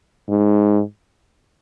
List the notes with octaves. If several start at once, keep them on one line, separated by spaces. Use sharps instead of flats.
G#2